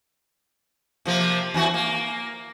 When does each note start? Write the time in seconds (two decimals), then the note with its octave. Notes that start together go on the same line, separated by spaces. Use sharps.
1.05 C3 F3 A#3
1.54 E2 E3 F#4
1.74 A#3